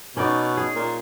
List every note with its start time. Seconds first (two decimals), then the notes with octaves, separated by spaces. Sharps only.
0.17 B2 C#4 D#4 D5
0.57 G#4
0.75 A#2